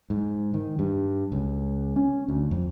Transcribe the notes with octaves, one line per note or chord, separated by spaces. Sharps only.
G#2
D#3
G2
C#2
C#4
D2
F2